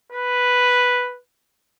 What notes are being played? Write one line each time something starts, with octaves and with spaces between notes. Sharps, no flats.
B4